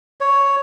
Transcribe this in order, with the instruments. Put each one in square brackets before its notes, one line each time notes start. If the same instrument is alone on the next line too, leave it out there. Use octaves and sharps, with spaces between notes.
[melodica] C#5